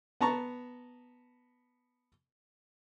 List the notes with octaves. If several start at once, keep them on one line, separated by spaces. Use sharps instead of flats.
B3 A5 A#5 C#6